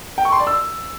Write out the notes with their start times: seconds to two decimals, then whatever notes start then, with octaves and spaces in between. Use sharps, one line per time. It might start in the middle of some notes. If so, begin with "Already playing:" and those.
0.18 G5
0.25 C#6
0.32 C6
0.40 D5
0.47 E6